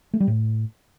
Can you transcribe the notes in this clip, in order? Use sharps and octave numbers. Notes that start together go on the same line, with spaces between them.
A3
G3
A2